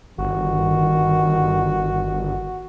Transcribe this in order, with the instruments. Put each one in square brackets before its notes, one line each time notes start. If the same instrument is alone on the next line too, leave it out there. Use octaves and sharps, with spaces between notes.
[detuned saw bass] G1 [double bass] D#3 [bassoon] F#4